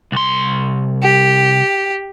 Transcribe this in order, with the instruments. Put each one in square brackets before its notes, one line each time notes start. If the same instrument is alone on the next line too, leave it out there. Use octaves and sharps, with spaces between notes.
[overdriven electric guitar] C2 C6
[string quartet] G4